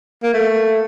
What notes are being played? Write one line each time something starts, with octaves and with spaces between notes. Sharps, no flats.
A#3
A3